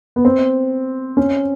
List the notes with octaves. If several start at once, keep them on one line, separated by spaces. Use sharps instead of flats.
B3
C4
C#4